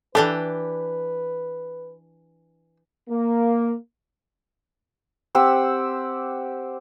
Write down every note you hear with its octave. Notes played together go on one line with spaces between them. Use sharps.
E3 D4 G4 A4 B4
A#3
C4 G4 F#5 E6